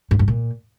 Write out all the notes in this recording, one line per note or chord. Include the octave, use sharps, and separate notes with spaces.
G#2
G2
A#2